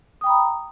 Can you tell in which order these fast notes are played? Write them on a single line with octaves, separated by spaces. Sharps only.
D#6 G5 B5 A#5